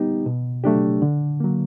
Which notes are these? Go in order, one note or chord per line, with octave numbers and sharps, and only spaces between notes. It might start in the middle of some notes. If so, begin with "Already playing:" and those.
Already playing: G3 B3 D#4 G4
B2
F#3 A3 D4 G4
D3
F#3 A#3